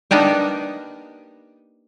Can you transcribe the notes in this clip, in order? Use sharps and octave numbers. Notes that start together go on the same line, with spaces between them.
A#3 B3 D4 D#4 G4